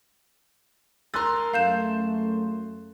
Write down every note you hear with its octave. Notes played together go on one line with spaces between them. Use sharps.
G#3 A#4 C6 E6 F#6 A6
F#2 A3 F5 G6 E7